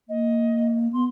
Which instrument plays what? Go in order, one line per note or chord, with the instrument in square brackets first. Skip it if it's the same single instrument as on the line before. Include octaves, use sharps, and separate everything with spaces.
[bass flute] A#3 [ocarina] D#5
[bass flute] B3 [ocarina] C6